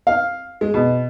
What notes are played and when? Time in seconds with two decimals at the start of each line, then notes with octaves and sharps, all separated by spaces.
0.07 F5
0.61 G#3
0.74 B2